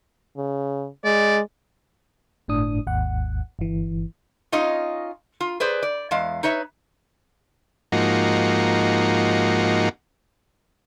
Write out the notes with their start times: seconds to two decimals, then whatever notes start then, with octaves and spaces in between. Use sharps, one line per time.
0.36 C#3
1.05 G#3 D5
2.48 G1 A2 D4 D#6
2.87 G#1 D#2 F#5
3.59 G1 E3
4.52 C#4 D#4 F4 D#5
5.41 F4
5.60 G#4 B4 C5 D5
5.83 D5
6.11 E2 G#3 F5
6.43 D#4 B4 C#5 E5
7.92 G#2 F3 A#3 D#4 F#4